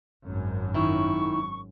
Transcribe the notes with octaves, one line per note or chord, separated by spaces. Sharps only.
G#1 F#2
D#3 E4 C#6